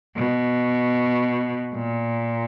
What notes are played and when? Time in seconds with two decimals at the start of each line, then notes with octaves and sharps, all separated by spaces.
0.16 B2
1.75 A#2